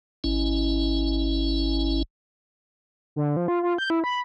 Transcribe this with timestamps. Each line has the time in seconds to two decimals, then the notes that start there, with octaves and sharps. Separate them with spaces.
0.24 G#1 C#4 E4
3.16 D3
3.37 F3
3.48 F4
3.63 F4
3.78 G6
3.90 E4
4.04 B5